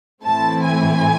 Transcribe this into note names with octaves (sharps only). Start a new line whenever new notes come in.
A2 E3 A3 C4 E4 A5
G#5